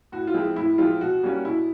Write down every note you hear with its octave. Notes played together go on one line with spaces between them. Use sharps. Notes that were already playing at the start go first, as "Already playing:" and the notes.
A2 F#4
F4
F3 G#3 C4 E4
A2 E4
F3 G#3 C4 E4 F4
B2 F#4
G3 A#3 C#4
B2 E4